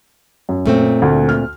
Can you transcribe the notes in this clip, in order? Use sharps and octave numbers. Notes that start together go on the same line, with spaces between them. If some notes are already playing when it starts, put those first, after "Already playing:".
F#2
A#2 A3 C4
D2
F6